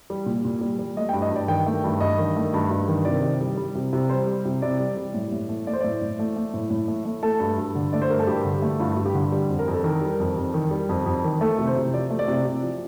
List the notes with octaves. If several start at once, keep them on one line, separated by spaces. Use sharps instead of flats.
G3
A#2
A#2
G3
G3
A3 D#5
G5
G2
D#5
G2 D5
D#3 G5
A3
G2
G2 D#5
D#3
A3
G2
G2
D#3
C3 D5
C3
G3
G3
C3
C3
G3 C5
G3
C3
C3 D5
G3
G3
A2
A2
A3
A3 D5
C5
A2 D5
A2
A3
A3
A2
A2
A3
A3
A3 A4
G2
G2
D3
A3 D5
C5
G2 A#4
A4
G2 G4
D3
A3
G2 F4
G2
G4
D3
G3
F2
A#4
F2
A4
D#3 A#4
G3
F2
F2
D#3
G3
F2
F2
D#3
A3 A4
C3
C5
C3
F3 D5
A3
D5
C3
C3
F3